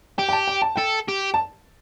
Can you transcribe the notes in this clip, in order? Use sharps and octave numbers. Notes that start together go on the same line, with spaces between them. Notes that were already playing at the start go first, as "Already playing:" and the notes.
G4 G5
G5
A5
G5
A5
A4 G5
G4
A5